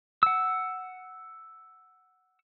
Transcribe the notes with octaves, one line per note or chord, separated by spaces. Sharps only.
F#5 E6